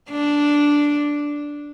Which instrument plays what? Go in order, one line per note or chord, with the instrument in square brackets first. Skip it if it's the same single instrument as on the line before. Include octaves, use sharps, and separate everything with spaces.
[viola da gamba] D4